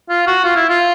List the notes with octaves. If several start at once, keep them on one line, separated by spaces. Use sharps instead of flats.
F4
F#4
F4
E4
F4